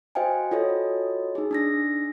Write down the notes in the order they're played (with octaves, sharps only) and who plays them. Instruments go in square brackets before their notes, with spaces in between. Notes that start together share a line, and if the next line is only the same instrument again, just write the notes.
[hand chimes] F#4 C5 D#5 F5 G5 G#5
F4 F#4 A4 C#5 D#5
D#4 G#4
D4 D#4 A#6